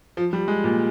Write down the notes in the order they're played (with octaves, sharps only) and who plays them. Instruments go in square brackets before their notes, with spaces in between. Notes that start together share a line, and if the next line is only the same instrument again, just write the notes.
[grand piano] F3
G3
G#3
A#2